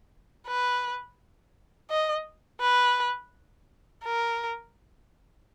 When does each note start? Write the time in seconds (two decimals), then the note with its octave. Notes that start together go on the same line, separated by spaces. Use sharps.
0.47 B4
1.90 D#5
2.61 B4
4.04 A#4